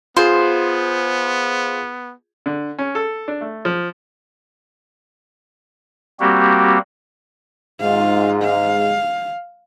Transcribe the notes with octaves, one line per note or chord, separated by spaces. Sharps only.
B3 F4 G#4 C5
D3
C#4
A4
D4
A3
F3
G3 A#3 C4 F#4 G4
G#2 G#3 F4 F5
F5